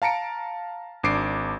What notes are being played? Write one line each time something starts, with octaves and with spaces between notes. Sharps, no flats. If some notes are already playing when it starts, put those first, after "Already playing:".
F5 A5 A#5 C#7 D7
G#1 D4 D6 C7 D7